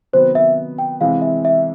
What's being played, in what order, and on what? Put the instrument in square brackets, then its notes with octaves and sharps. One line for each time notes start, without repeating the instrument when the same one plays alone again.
[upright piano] C3 D#3 F#3 B3 [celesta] C5
[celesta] E5
G5
[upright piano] C3 E3 G#3 C4 E4 [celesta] F5
[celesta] E5
E5